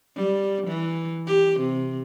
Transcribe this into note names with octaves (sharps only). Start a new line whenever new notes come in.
G3
E3
G4
C3